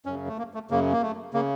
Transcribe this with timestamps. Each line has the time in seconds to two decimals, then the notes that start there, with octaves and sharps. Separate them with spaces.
0.06 F#2 C#3 C#4
0.28 A3
0.38 A#3
0.54 A3
0.70 F#2 C#3 A#3
0.93 A#3
1.02 A3
1.33 C#3 A#3